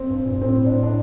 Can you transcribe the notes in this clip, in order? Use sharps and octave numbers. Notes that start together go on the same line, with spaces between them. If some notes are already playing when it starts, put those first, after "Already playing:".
Already playing: C4
G2
A#2
A2 C4
D4
D4